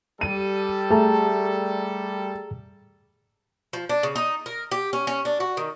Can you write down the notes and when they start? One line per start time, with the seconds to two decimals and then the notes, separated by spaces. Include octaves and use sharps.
0.21 G3 G4 A4 D#7
0.91 A3 G#4 A5 A#5
3.73 F3
3.89 D4
4.03 C#3
4.16 D#4
4.46 A#4
4.71 G4
4.93 C#4
5.07 C#4
5.25 D4
5.40 F#4
5.57 D#3